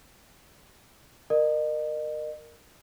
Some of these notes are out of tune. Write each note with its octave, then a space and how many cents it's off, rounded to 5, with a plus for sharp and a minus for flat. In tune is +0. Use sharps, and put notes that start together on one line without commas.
A#4 +0 D#5 -40